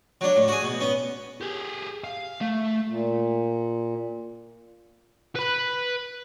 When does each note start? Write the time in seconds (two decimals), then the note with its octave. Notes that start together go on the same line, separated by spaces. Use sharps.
0.21 F#3 D4
0.36 A2
0.48 F#4 G#4
0.63 B2
0.80 B3 C#4
1.41 G4 G#4
2.04 F5
2.41 A3
2.88 A#2
5.35 B4 B5